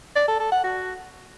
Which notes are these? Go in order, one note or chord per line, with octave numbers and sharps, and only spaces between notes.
D5
A4
A4
F#5
F#4